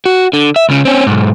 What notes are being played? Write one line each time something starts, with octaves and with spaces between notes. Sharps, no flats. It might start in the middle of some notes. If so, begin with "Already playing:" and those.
F#4
D3
E5
C#2 C#3
C4 C#4
B1 G#2